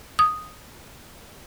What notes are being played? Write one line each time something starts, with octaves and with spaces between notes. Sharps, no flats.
D#6